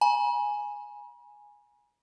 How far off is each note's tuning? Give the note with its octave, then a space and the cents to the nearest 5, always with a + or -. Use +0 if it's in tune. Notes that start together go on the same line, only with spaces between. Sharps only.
G#5 +0 B5 -45